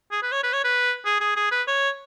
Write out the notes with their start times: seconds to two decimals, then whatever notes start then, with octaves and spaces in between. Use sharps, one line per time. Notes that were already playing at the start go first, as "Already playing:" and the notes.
0.11 G#4
0.23 B4
0.32 C#5
0.43 B4
0.53 C#5
0.64 B4
1.05 G#4
1.20 G#4
1.36 G#4
1.52 B4
1.67 C#5